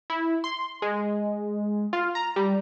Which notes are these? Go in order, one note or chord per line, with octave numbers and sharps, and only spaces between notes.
E4
C6
G#3
F4
A#5
G3